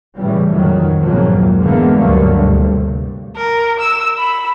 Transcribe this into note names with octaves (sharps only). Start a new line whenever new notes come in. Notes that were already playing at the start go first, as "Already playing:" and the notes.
A2 C#3 E3 G3
F2 D#3 F#3
B1 F2 G#2 F#3 G#3 A#3
D3 E3 G#3 A#3 B3
D2 G2 D3 F#3 A3 A#3
G2 C3
A#4
E6
B5